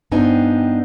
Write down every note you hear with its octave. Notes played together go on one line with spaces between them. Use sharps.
G2 B3 C4 D4 D#4 G#5